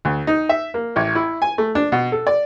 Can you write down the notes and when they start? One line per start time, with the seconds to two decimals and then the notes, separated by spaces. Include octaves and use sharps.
0.05 D2
0.27 D#4
0.49 E5
0.74 A#3
0.96 A1
1.15 E4
1.42 G#5
1.58 A3
1.75 D4
1.92 B2
2.12 A4
2.27 D5